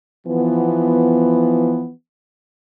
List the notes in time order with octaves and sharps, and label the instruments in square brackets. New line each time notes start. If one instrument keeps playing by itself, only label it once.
[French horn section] E3 F3 B3